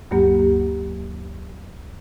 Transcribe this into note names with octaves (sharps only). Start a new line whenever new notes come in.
D2 G2 F#3 A#3 G4